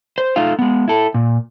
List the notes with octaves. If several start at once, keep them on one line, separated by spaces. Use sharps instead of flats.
C5
A3 D#4 F4 F5
G#3 B3
E4 A4
A#2